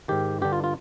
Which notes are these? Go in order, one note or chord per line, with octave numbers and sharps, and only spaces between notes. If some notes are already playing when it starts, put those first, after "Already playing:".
G#2 D#3 G4
G2 D3 G4
F4
F4